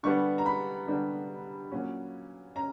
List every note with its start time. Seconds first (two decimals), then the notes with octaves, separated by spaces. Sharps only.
0.03 D3 G3 B3 D4 C#6
0.38 A#5
0.46 B5
0.87 D3 G3 B3 D4
1.71 A#2 F#3 C#4
2.56 C#4 A#5